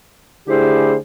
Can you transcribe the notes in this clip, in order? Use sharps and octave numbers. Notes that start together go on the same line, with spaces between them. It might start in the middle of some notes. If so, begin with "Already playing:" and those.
D3 A3 E4 G4 G#4 C5